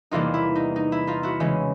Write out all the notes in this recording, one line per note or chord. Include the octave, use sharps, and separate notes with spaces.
E2 C3 E3 G3 A#3 D#4 F4
E4
D#4
D#4
E4
D#4 F4
E4 F#4
C#3 E3 G#3 C#4